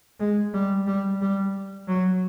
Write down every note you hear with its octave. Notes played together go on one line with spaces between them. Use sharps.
G#3
G3
G3
G3
F#3